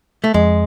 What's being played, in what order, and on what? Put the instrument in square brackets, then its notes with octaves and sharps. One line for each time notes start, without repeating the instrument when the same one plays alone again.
[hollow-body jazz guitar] A3
[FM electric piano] F2 [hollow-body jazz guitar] G#3